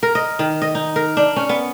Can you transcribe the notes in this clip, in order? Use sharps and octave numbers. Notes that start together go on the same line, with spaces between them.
A#4
D#5
D#3
D#5
D#4
A#4
D4
C#4
B3